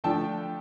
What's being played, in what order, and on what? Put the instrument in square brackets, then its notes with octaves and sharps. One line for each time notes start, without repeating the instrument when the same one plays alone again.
[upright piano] D3 F3 A3 G5 A5